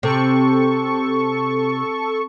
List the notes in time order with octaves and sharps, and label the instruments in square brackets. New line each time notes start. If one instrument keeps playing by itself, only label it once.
[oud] C3 [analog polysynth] A4 C#6